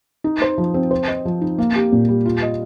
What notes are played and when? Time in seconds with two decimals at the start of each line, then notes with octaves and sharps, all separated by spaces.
0.24 D#4
0.42 C5
0.58 F3
0.74 C4
0.91 C5
1.08 D#5
1.25 F3
1.41 D#4
1.58 A#3
1.76 G4
1.92 A#2
2.09 G3
2.25 F4
2.42 D#5